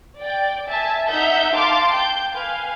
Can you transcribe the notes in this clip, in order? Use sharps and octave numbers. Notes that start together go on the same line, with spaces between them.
D5 G5
E5 G#5 A5
D#4 E5 F#5 G6
F5 A5 C6 D6
G5 G6
B4 F5 G#5